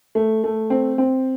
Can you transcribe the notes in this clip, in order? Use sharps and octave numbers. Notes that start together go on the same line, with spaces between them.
A3
A3
C4
C4